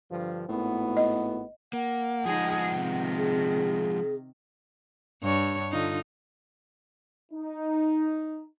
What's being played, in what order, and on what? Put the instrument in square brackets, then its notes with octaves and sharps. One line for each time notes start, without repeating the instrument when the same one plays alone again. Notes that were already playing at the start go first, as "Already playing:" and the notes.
[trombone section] G2 D3 F3
[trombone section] G#1 B3 [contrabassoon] A2
[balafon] D#5
[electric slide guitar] A#3 [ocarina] F#5
[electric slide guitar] F3 G#3 [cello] D#4 G#4
[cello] C3 D#3
[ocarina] G#4
[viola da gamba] G2 C#5
D3 D#4 F4
[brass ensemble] D#4